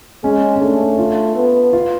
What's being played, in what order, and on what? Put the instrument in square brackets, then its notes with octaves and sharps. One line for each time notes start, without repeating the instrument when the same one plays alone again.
[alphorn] G#3 [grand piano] C#4
[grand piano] C#4
[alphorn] A3 [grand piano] D4
[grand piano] F4
[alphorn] B3
[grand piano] F4